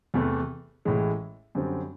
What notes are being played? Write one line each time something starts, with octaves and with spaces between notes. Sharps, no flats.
E2 C3 E3 A3
A1 A2 E3 G#3
F#2 D3 G3 C4